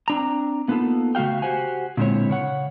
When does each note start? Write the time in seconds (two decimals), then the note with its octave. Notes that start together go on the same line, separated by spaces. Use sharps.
0.08 C4 D4 A#5
0.68 A#3 B3 D#4 F4 A4
1.15 C#3 A3 F#4 F5 G5
1.42 F#4 G4 C5 F#5 G#5
1.97 A#2 D3 G#3 C4 E4 C#5
2.30 C#3 C#5 F#5